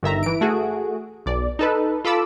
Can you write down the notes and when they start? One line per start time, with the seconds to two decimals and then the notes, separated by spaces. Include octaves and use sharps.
0.03 G1 D#3 E5 A#5
0.23 E3 D7
0.41 A3 F#4 G#4
1.26 B1 D5
1.59 D#4 A4 B4
2.04 F4 A4 B5 D6 E6